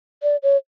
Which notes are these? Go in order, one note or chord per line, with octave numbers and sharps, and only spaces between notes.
D5
C#5